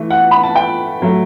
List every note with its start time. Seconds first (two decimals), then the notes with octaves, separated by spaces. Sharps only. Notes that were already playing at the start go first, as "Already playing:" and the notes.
Already playing: E3 A3
0.11 F#5
0.31 B5
0.43 A5
0.55 G5
1.02 F#3 A3